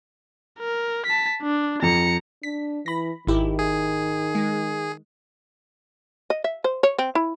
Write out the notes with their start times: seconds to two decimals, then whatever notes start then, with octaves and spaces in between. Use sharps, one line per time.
0.59 A#4
1.06 A5 B6
1.43 D4
1.82 F2 A#5 C#7
2.43 D4 B6
2.86 E3 B5 A#6
3.27 G#1 D#3 E4 G4
3.59 G#4
4.35 G#3
6.30 D#5
6.44 E5
6.64 C5
6.83 C#5
6.99 C4
7.15 E4